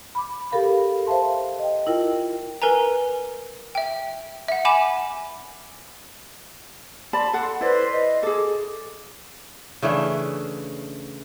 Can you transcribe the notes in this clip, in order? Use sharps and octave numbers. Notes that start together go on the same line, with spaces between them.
B5 D6
G4 A4 A#4 F5 B5
C5 E5 F5 A5 C6
D#5 G5
E4 F4 A#4 G5
A#4 B4 G#5 A#5
E5 G5
E5 F#5
E5 F#5 G#5 B5 D6 E7
D5 A5 B5 C6
A4 F#5
E4 B4 C5 D5 C6
D#5
G#4 A4 D6
C#3 E3 A3 D4